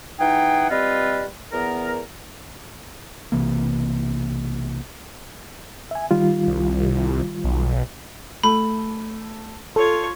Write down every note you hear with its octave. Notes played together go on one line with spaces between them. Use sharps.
E3 D#4 G#4 F#5 G5
G3 C4 F4 B4 D#5
E2 B3 A#4
B1 C3 E3 A#3
E5 G#5
D#3 G3 F4
C2
B1
A3 B5
F4 A4 C#5